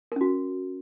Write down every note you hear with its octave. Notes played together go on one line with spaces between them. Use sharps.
C#4 F#4 A#4